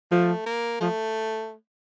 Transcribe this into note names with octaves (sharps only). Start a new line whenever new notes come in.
F3 A3
A#3
F3 A3